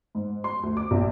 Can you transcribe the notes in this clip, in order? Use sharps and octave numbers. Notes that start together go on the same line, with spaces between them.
G#2
C6
D2
D6
A#1